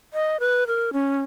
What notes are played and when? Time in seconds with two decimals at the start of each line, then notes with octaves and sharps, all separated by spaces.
0.13 D#5
0.40 B4
0.67 A#4
0.93 C#4